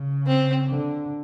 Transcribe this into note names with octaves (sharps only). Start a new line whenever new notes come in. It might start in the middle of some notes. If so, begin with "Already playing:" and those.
Already playing: C#3
C4
D3